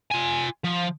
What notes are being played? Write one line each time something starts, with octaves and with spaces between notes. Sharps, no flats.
F4 G#5
F3